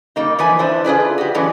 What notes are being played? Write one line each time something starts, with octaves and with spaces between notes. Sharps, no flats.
G3 A#3 D#4
E3 F3 B4 G#5
D4 E4 C5
F4 G#4 B4 D5
F#4 G4
F#2 A2 E3 G#3 C#4